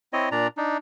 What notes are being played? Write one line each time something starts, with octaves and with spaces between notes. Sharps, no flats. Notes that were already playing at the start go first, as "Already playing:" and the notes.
C4 E4 C#5 D#5
A#2 D4 D5 A#5
D4 D#4